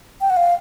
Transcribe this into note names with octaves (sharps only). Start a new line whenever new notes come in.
G5
F#5
F5